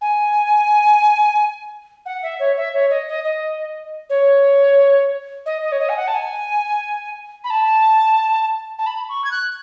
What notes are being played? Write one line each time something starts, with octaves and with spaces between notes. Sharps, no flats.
G#5
F#5
E5
C#5
E5
C#5
D#5
D#5
D#5
C#5
D#5
D#5
C#5
D#5
G#5
F#5
A5
G#5
B5
A5
A5
B5
C#6
G#6
F#6